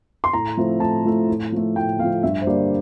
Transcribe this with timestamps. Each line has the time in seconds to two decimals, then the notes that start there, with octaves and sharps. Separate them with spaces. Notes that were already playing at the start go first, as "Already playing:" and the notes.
0.24 C6
0.33 A2 A#5
0.57 F3 A3 C4 E4
0.80 A2 A5
1.05 F3 A3 C4 E4
1.28 A2
1.52 F3 A3
1.75 A2 G5
1.99 A3 F5
2.03 F3
2.23 G2 E5
2.41 C5
2.47 D3 G3 A#3 D5